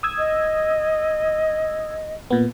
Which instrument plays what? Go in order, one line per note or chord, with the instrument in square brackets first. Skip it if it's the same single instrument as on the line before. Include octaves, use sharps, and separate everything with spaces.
[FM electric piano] D#6 E6 G#6
[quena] D#5
[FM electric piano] A#2 B3